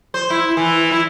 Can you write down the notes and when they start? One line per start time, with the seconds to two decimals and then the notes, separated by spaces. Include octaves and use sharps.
0.14 C5
0.30 E4
0.57 E3
0.91 E4